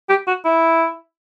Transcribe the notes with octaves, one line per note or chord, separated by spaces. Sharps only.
G4
F#4
E4